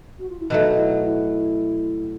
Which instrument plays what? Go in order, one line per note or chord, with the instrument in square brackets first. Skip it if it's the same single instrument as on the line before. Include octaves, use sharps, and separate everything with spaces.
[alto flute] F#4
F4
E4
[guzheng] B2 F#3 A3 [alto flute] D#4
[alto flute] E4
E4